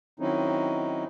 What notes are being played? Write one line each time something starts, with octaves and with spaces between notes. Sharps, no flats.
D#3 F#3 C4 C#4 D#4 E4